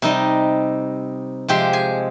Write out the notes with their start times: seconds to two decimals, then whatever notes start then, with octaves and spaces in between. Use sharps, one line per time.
0.02 C3 G3 D#4 D#5
1.48 C3 F3 G#3 G4 G5
1.73 G#4 G#5